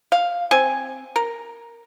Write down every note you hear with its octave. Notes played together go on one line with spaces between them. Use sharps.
F5
C4 G#5
A#4